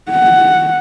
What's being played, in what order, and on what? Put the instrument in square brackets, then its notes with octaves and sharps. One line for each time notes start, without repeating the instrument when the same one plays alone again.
[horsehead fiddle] F#5